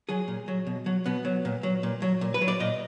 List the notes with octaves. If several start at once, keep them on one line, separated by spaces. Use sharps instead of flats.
F#3 G#4
A#2
F#3
B2
F#3
B2 B3
F#3
A#2
F#3
A#2
F#3
A#2
B4
F#3
D5
A#2 D#5